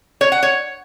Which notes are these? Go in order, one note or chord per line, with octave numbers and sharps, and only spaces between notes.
C#5
F#5
C#5